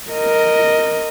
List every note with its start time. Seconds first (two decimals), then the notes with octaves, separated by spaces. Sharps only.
0.11 A#4 D#5